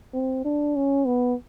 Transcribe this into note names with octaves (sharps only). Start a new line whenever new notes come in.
C4
D4
C#4
B3